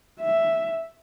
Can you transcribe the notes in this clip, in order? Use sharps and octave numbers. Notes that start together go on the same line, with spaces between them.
E5